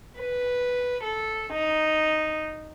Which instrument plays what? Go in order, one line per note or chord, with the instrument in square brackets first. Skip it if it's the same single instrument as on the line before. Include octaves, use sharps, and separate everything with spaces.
[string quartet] B4
A4
D#4